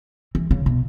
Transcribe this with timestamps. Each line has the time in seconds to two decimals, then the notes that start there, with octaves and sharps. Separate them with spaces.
0.35 E3
0.51 C#3
0.66 B2